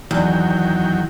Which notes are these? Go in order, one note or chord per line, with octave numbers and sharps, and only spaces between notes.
E2 D#3 F#3 G5